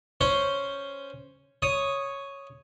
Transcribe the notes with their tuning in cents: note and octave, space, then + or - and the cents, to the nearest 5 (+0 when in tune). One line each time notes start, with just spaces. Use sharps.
C#4 +0 C5 +0
C#5 +0 D#6 +0